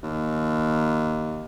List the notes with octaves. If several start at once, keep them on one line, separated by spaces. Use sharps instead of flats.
D#2